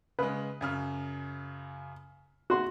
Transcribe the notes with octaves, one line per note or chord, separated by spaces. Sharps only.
C#3 G#3 B4
F#2 C#3 F6
F#4 C6